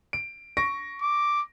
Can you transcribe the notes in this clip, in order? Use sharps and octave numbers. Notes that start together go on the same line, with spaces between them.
D7
C#6 A#6 D7
D6